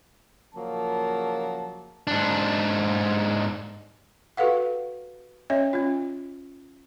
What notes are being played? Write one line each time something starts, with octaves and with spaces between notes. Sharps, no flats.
A#2 C#3 F3 F#3 A#3 A5
G#2 D4
F#4 G4 A4 B4 F5 F#5
C#4 C#5 D#5 E5
C#4 F4